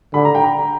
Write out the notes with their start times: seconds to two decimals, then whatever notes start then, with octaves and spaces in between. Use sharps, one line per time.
0.14 D3 B5
0.25 A#5
0.35 G5
0.44 A#5